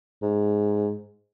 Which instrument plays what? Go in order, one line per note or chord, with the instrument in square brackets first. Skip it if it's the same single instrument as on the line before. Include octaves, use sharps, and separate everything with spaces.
[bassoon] G#2